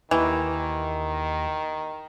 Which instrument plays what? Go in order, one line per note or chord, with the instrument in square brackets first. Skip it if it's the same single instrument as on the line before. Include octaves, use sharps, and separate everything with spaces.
[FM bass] D#2 [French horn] D#3 [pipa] E3